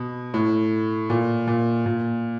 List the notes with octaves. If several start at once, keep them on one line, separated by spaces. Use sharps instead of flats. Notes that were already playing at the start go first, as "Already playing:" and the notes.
Already playing: B2
A2
A#2
A#2
A#2